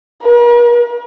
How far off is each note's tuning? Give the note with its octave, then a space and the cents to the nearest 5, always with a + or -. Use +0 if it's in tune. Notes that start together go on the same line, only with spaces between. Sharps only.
A#4 +45